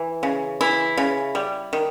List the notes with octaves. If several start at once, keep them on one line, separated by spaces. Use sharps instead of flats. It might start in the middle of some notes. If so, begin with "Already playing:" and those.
Already playing: E3
C#3
E3 E4
C#3
G3
D#3